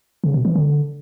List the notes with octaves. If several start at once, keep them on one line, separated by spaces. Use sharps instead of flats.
C#3
B2
E3
D3